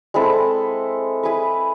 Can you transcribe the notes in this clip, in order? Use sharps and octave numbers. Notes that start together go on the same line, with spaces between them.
G#3 C4 E4 A4
E4 G#4 B4